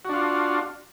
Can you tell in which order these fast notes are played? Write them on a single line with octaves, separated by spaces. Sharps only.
F#4 D4 F4